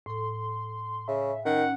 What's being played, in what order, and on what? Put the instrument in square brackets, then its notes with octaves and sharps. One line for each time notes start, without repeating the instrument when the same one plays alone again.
[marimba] A2 A4 [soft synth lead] C6
[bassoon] C#3 [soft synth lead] E5
[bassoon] D#3 [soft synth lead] C#4 [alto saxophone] F#5